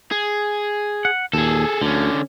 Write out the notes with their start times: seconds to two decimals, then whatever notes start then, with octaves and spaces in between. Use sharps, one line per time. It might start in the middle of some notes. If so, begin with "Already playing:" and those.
0.11 G#4
1.05 F#5
1.33 D#2 A#2 G#4 A4
1.82 D2 D3 C#4